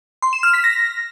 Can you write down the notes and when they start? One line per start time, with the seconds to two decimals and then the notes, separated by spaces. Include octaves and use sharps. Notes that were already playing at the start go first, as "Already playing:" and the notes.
0.22 C6
0.33 E7
0.43 F6
0.54 B6
0.64 A#6